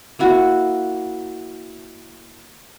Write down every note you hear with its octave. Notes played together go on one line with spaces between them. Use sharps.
A#3 E4 F#4